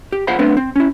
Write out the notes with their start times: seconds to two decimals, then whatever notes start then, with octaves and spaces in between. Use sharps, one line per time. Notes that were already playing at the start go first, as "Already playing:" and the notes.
0.12 G4
0.27 F4 G#4 C5 F5 F#5 B5
0.39 A3 B3 C4 D4 B4
0.57 C4
0.76 C#4 E4